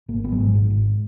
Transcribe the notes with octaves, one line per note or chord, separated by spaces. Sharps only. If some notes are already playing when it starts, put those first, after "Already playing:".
G#1 A#3
G#1 B3
F#3
G#2 G#3
G#2
G#1